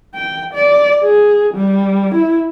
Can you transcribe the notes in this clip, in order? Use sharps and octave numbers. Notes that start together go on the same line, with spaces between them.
G5
D5
G#4
G3
E4